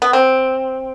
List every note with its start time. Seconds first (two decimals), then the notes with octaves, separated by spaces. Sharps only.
0.02 B3
0.13 C4